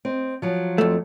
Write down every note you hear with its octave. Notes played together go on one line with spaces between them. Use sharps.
C4 D#5
F3 F#3
F2 A3